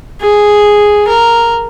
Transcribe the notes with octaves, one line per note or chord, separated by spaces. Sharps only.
G#4
A#4